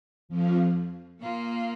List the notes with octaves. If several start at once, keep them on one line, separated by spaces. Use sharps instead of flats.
F2 F3
A#2 A#3 F4